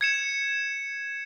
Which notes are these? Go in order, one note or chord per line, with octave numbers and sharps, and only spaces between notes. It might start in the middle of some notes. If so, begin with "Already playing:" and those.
G#6 C#7 E7